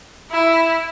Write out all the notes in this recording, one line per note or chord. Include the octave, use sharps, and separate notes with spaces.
E4